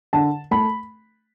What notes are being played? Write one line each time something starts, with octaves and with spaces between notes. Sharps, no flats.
D3 A5
A3 B5